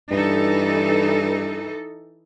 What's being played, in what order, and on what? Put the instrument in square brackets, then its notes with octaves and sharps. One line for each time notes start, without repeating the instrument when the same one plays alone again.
[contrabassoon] G2 [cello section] E3 D#4 A4